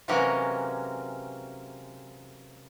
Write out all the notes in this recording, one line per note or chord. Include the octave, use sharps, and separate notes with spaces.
C3 E3 F#3 G#3 A#3 C#4